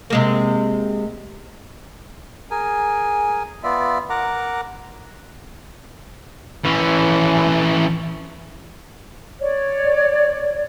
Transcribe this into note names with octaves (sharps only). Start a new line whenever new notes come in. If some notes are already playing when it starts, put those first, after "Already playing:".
C3 G#3 A#3
G#4 A#4 G#5
B3 F4 D5 E5
A#4 F#5 A#5 D6
E3 C#4
C#5 D5